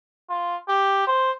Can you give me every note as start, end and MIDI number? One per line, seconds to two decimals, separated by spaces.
0.30 0.56 65
0.68 1.03 67
1.07 1.31 72